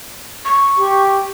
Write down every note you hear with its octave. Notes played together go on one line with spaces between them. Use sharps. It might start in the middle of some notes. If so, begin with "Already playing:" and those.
C#6
G4